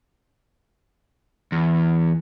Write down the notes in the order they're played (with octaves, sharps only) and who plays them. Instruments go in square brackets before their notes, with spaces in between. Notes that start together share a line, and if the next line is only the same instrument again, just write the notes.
[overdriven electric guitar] E2